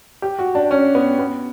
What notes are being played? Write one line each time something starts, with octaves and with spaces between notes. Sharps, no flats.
G4
F#4
D4
C#4
B3
B3